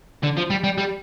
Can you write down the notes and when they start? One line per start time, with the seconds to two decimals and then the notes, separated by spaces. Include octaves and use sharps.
0.23 D3
0.37 F3
0.50 G3
0.64 G3
0.78 G3